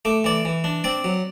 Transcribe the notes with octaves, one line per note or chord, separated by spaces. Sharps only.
A3 D6
E3 D5 D6
E3
D4
C4 D5 D6
F#3